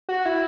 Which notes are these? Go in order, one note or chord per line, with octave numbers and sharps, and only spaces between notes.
F#4
E4